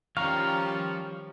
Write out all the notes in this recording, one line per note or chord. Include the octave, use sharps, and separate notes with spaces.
D#3 F3 G3 C#4 F4 F5 A#5 C#6